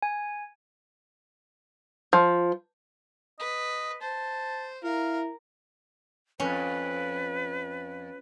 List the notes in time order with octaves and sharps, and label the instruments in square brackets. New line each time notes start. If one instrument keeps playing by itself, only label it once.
[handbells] G#5
[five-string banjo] F3
[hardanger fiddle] B4 [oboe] D#5
[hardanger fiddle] C5 [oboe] A5
[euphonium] E4 [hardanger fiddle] A#4 [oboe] F5
[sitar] F2 [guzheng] C#4 [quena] B4